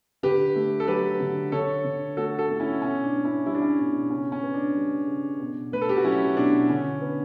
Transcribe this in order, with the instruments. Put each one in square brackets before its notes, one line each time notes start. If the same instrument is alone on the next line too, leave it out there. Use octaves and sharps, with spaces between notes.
[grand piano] D3 G4 B4
A3
A4
F#3 G4 B4
D3
D3 A4 C#5
D3
A3 F#4 A4
F#4 A4
A3
F#4
C#4 E4
B2 C#4
D4
B3
C#4 E4
G3 E4
D4
C#4 E4
B2 D4
C#3 C#4
C#4
B3
D4
G3
C#3
B2
A3 B4
A4
G4
F#4
F#3 C#4 E4
B2 D4
D3 C#4
B3